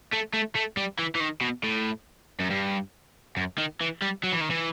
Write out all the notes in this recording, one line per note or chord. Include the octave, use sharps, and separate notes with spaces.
A3
A3
A3
G3
E3
E3
D#3
B2
A2
F#2
G2
F#2
D#3
E3
G3
F#3
E3
D#3
E3